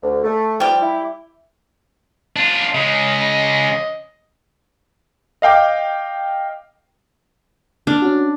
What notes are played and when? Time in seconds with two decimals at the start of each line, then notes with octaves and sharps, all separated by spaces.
0.03 D2
0.24 A3
0.60 F3 G3 G4
0.82 E4
2.36 D4 F4
2.75 C#3 G#3 D#5
5.42 D#5 F5 G5 D6
7.87 D4 F6
8.02 C#4 F#4